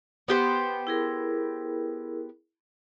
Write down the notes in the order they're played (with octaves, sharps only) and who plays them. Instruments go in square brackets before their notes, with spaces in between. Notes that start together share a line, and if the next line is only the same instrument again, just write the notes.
[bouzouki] B3 G4 C5
[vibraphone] E4 G#4 A#4